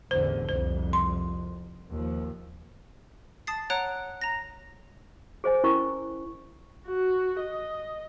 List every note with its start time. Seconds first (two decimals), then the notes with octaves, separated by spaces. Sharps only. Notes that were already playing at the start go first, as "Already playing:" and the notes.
0.11 A1 E2 D3 C5
0.49 C2 F2 C5
0.93 C6
1.90 D#2 F3
3.47 A5 D#6 A6 C7
3.70 C#5 F#5 A#5 F#6 D7
4.21 A#5 A#6
5.44 G#4 C5 D#5 G#5
5.64 C#4 E4 A#4 D#5 C#6
6.88 F#4
7.40 D#5